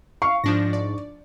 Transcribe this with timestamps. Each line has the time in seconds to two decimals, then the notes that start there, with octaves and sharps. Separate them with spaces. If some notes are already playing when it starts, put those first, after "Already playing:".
0.22 F5 C#6
0.44 G#2 F3 D4 A#6
0.73 D5